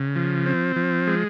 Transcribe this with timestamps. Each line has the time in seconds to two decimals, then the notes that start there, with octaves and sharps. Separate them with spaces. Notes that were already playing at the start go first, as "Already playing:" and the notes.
Already playing: C#3
0.16 F3
0.46 C4
0.76 F3
1.07 G#3